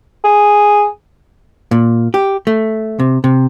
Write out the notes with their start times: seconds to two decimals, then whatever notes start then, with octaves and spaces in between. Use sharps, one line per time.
0.24 G#4
1.71 A#2
2.14 G4
2.47 A3
3.00 C3
3.24 C3